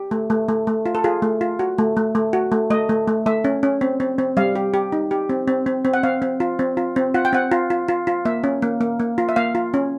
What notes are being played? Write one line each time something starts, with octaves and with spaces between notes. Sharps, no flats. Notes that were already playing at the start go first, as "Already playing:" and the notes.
Already playing: G4
A3
A3
A3
A3
F4
A4
F4 G#4
A3
F4
F#4
A3
A3
A3
F#4
A3
A3 D#5
A3
A3
A3 E5
C#4
C#4
C4
C4
C4
G3 F5
G4
G4
D#4
G4
C4
C4
C4
C4
F#5
C4 F5
C4
F4
C4
F4
C4
F4 F#5
G5
C4 F#5
F4
F4
F4
F4
A#3 E5
C#4
A#3
A#3
A#3
F4
E5
A#3 F5
F4
C#4